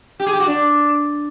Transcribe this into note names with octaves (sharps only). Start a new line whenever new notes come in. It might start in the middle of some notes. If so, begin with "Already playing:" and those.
G4
G#4
G4
F#4
D4